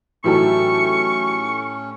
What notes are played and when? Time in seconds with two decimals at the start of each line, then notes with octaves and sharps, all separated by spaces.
0.24 A2 E3 F#3 C#4 D#4 G4 A4 C#6